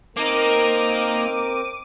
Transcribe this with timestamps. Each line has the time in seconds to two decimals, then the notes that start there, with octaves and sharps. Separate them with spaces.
0.17 A#3 C4 D#4 A#4 D6 D#7